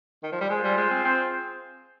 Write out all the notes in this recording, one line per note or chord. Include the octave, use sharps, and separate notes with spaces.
D#3
F3
G3
G#3 F4 G#4 C5
G3
G#3
C4
C4